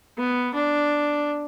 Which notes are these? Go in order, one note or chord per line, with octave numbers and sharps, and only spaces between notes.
B3
D4